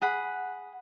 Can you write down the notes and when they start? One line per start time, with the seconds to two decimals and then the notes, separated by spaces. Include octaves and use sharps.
0.02 G#4 F#5 B5